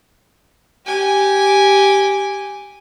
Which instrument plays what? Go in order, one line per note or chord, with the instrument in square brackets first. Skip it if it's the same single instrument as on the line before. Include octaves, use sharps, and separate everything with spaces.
[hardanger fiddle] G4 G#5